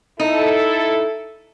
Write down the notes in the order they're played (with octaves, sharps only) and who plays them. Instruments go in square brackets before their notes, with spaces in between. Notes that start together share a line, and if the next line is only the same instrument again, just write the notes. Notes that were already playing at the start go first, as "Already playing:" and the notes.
[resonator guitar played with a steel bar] D#4 [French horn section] E4 A4